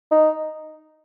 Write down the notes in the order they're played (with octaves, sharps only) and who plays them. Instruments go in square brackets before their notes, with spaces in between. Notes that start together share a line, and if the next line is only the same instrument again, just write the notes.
[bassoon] D#4